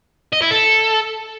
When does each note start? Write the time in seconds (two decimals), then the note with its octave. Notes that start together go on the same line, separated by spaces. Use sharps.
0.33 D#5
0.42 E4
0.51 A4